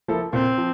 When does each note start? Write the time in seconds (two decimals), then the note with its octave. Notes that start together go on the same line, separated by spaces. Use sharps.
0.08 F3 A#3 E4 A4
0.33 A#2 C4
0.58 F3